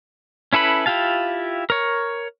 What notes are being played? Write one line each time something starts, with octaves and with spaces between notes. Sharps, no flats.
C#4 E4 A4 B4 B5
E4 F4 G4 F5 A5
A#4 C#5